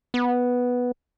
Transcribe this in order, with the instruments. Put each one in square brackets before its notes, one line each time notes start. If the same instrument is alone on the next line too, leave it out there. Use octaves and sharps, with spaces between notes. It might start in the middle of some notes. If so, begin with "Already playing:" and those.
[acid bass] B3